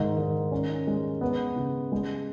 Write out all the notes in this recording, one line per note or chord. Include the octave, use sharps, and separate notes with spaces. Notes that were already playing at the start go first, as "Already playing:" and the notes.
Already playing: G#2 D#3
D#3
C#4
G#3
B3
C#3
G#3